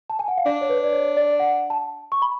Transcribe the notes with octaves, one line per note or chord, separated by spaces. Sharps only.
A5
G#5
F#5
F5
D4 D5
C#5
B4
D5
C#5
D5
F#5
A5
C#6
B5